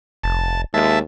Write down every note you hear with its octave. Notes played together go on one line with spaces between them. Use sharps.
F1 A5
D#2 G#3 E5 A5